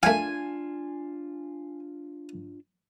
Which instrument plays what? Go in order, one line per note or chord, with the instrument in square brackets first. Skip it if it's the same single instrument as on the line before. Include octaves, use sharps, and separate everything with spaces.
[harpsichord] A3 F5 [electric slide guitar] D4 F4 [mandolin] G#5